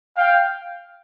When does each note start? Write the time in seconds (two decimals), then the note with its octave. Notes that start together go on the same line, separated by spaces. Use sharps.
0.17 F5 G5